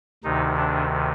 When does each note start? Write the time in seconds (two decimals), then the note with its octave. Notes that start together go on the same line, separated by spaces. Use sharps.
0.24 D2 C3 D#3 D#4
0.57 D4